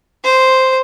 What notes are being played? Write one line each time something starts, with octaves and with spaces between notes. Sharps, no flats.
C5